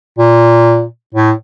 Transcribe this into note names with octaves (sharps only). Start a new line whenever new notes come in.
A#2
A2